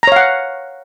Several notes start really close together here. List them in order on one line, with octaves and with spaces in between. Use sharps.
A#5 C#5 F5 F#5